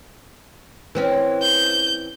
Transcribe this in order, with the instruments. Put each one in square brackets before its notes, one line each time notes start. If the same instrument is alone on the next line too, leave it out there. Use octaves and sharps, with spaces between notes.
[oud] E3 C4 C#4
[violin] G6